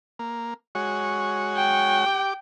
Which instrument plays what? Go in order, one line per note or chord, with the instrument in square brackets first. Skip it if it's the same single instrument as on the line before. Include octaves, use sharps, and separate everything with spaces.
[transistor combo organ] A#3
G#3 F#4 C#5
[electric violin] G5
[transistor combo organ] G4 D6